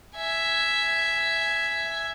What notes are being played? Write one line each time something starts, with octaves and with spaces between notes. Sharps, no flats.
E5 G#5